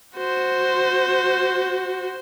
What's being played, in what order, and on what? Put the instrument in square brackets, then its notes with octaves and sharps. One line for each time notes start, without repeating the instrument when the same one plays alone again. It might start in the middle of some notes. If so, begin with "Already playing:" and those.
[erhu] F#4 [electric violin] C5